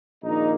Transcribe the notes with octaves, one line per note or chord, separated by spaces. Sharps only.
A#1 G#2 D#3 A#3 D#4